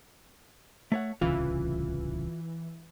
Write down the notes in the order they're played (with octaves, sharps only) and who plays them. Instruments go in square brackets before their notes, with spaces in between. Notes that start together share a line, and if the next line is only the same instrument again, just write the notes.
[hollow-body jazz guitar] A3 C#5 F#5
[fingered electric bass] D1 C2 C#3 [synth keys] E3 [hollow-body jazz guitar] F4